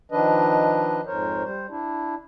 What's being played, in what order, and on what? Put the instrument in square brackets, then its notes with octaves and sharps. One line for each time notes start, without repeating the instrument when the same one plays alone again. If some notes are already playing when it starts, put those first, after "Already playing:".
[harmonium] D#3 F3 D4 B4 D#5
F2 G#2 A#4 C5 C#5
G3 C5
D4 E4